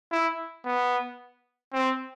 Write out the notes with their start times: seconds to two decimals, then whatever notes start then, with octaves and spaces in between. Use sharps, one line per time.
0.12 E4
0.66 B3
1.74 C4